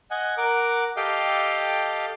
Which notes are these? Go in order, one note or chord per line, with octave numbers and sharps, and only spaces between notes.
D#5 F#5 G#5
A#4 F#5 D6
G4 A4 D#5 F5 G5